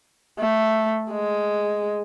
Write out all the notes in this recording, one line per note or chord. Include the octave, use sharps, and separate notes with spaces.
A3
G#3